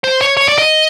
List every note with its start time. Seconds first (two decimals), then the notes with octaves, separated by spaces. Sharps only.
0.04 C5
0.21 C#5
0.37 C#5
0.48 D5
0.58 D#5